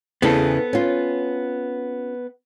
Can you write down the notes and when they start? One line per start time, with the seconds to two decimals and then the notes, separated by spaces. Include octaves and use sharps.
0.22 E2 C#3 E3 B3 C4 A4
0.73 C#4 F4